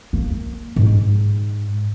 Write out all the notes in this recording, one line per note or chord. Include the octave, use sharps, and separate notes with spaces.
A#3
G#2